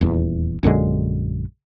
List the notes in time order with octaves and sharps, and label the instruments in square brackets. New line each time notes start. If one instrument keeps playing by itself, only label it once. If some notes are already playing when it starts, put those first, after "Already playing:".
[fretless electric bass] D#1 E2
A#1 F#2 D3 G#3